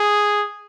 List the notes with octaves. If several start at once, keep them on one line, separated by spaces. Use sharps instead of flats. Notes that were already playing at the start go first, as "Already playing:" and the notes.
Already playing: G#4